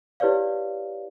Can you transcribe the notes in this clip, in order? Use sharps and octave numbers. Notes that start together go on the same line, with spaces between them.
E4 G4 B4 C#5 D5 F5